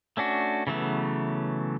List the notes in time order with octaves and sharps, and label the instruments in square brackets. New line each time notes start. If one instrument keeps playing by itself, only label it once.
[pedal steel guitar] A3 C#4 D4 F#4
C#3 E3 F#3 A3 B3